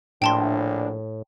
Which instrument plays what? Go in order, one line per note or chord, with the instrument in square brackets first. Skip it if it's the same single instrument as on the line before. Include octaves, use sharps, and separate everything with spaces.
[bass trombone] A#1 [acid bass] A2 [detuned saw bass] D4 [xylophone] G5 A5 C6